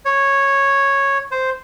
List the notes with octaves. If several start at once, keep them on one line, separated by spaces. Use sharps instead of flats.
C#5
C5